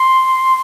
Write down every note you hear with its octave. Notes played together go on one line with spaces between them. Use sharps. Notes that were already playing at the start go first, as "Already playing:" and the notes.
Already playing: C6